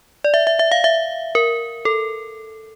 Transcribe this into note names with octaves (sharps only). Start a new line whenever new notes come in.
D5
E5
E5
E5
F5
E5
A#4
A4